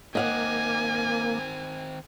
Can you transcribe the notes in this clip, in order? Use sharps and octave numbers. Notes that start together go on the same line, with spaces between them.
D#3 A#3 C4 D#5 F5 F#5 G#5